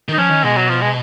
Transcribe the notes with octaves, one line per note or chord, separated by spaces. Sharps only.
D#3 D#4
F3 C#4
D#3
B2 G#3
F#3
F3
G#3